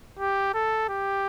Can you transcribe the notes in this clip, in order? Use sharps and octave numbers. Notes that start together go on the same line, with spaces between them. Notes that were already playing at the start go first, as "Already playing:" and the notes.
G4
A4
G4